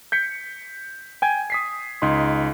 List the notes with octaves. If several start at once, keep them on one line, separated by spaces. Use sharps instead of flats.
G6 B6 C#7
G5 G#5 G#6
D#6 B6 C7
C#2 D#4 C6